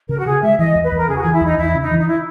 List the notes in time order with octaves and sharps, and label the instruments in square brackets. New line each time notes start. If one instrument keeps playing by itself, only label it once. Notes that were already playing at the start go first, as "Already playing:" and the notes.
[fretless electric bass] C#3 [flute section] A#4
[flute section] F#4
[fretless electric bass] C#3 [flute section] G#4
[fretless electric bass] G#3 [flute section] E5
[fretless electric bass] E3 [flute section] D#5
[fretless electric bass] E2
[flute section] B4
[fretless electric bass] E2
[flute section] A#4
[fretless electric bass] C#3 [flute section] G#4
[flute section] F#4
G#4
[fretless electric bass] E3
[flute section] E4
[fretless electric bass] E2 [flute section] D#4
[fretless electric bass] E2 [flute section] E4
[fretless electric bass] C#3
[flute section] D#4
[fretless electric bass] E3
[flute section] D#4
E4